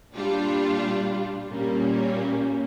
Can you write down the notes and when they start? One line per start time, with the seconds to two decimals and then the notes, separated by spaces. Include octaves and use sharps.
0.12 A#2 G3 D4 F4
1.50 A#2 G3 A#3 C#4